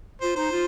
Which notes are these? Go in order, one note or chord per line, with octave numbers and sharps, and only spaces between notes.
F4 C5
D#4 C5
F4